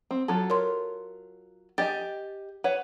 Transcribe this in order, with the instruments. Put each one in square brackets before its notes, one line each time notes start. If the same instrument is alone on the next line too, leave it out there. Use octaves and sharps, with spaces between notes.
[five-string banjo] C4
[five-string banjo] F#3 F4 A4 [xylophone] A5
[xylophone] A#4 C#5 C6
[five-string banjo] G4 D#5 G#5 [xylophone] A6
[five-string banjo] B4 C#5 F#5